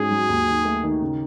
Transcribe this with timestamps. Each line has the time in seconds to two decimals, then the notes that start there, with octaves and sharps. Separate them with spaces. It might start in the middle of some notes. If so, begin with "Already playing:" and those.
Already playing: G#2 C#4 F#4 G#4
0.11 F#3
0.28 D#2
0.47 D#3
0.65 A3
0.83 D#3
1.01 C#3